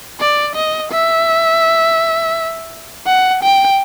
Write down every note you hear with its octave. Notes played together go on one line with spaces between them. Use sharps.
D5
D#5
E5
F#5
G5